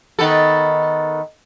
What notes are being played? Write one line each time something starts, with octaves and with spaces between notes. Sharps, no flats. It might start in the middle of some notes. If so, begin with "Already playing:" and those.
D#3 B3 A4